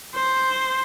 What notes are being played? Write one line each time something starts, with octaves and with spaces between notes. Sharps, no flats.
C5